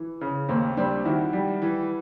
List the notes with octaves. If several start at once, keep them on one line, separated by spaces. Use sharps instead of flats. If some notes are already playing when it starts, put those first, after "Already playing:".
Already playing: E3
C#3
D#2 A#3 C4
G3 C4 D4
D#3 E4 F#4
G3
E3